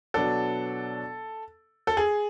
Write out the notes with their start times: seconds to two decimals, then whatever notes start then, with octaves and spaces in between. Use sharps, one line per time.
0.14 B2 F#3 B3 D4 A4
1.87 A4
1.97 G#4